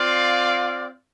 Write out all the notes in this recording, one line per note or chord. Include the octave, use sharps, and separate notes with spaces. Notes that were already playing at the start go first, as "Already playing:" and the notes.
Already playing: C4 F4 D5 F5